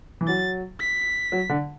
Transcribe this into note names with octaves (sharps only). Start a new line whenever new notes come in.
E3
F#3 A6
B6
F#3
D3